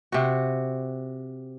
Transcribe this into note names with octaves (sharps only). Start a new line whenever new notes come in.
C3 F#4